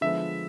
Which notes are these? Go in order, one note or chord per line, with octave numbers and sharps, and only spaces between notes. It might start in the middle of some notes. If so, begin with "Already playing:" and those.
D3 F3 G#3 B3 E5